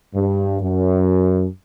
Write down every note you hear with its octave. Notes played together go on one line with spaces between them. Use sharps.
G2
F#2